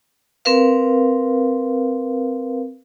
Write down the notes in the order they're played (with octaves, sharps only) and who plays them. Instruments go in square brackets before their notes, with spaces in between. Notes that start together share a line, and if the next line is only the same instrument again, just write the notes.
[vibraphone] C4 A#4 B4 F5